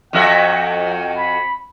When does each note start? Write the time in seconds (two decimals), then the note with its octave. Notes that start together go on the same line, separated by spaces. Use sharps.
0.13 F2 F#4 E5 G5
1.17 B5